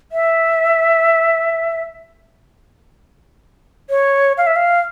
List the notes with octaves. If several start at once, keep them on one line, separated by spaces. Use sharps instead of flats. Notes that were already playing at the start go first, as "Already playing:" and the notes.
E5
C#5
F5
E5
F5